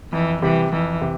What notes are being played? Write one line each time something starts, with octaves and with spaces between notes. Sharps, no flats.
F2 E3
C3 E3 G3
F2 E3
C3